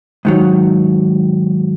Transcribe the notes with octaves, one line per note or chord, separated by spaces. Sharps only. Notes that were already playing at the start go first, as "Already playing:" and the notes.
G#2 D#3 F#3